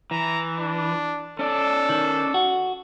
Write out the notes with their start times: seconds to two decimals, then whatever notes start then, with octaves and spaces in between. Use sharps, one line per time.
0.11 E3 A#5
0.59 D4
1.39 C#4 A4 D5
1.89 D#3
2.34 F#4